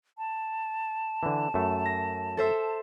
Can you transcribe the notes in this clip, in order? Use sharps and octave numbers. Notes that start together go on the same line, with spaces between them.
A5
D3 E3
F#2 A3
A#6
A4 C5 E5